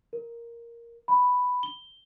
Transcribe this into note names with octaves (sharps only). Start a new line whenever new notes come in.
A#4
B5
G7